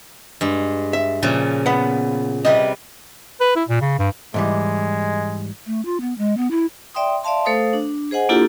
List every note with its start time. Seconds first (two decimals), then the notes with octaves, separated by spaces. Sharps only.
0.41 G2 G#3
0.93 E5
1.22 A#2 C#3 F3
1.66 B3 B4 F#5
2.45 C3 G3 B4 D#5
3.41 B4
3.56 E4
3.69 A#2
3.81 C#3
3.99 G2
4.34 G#2 E3 G3 G#3
5.66 A3
5.85 F4
6.01 B3
6.18 G#3
6.37 B3
6.51 E4
6.94 D5 E5 G5 C6 D#6
7.23 D5 E5 F5 A5 C6
7.45 A3 A4 C5 F5 D#6
7.73 D4
8.11 G#4 C5 D#5 F#5 G#5
8.29 A#3 D4 E4 F4 G4 A4